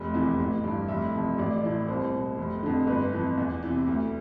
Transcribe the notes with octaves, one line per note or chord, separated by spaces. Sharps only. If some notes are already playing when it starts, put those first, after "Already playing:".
Already playing: F1
E2 C3 E3
A1
G2 E3
F1 E5
F2 C3 E3
A1 D5
A2 E3
C2 C5
B2
F1
F2 D3
G1 B4
F2 E3
E2
C3 E3
D2